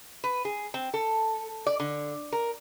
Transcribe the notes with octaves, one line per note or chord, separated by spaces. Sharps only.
B4
G#4
C4
A4
D5
D3
A#4